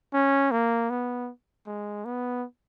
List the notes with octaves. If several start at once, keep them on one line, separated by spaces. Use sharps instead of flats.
C#4
A#3
B3
G#3
B3